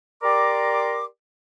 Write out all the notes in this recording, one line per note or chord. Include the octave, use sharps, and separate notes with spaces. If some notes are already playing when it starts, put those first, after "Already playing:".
G4 A#4 D5 A#5 C6 D6